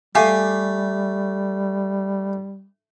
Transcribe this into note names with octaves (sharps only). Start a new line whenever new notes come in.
G3 A3 G4 F5 G#5